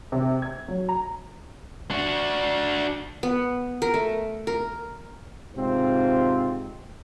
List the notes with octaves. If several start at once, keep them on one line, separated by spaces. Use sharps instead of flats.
C3
G#6
F#3
A#5
D4 F#4
B3
A#4
A3
A#4
G#2 C3 C4 F4